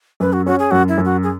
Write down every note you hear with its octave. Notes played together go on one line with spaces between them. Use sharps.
F#2 B4
F#4
C#4 F#4
G#4
F#2 F#4
E4
F#2
F#4
G#4